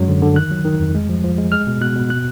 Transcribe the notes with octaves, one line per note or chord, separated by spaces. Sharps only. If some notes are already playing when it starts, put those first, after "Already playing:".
Already playing: F#2 F#3 G#3
D3
D3
D#3 F#6
F#3
D#3
F2
G#3
F3
F3
G#3
G#3 F6
B2
B2 F#6
B2
B2 F#6